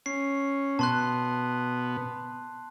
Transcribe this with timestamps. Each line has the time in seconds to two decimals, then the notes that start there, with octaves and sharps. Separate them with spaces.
0.06 C#4 C7
0.79 B2 B3 A5 C6 F#6